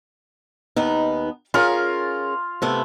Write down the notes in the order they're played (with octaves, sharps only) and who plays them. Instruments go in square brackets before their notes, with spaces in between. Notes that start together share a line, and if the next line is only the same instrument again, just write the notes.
[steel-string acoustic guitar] D#2 B3 D#4
[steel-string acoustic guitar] C#4 G#4 A#4 [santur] F4
[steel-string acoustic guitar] C3 A3 B3